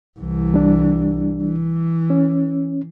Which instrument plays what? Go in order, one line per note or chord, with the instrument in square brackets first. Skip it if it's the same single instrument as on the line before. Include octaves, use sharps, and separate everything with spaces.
[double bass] C2 E3
[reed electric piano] G3 D4
[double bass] E3
[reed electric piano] C#4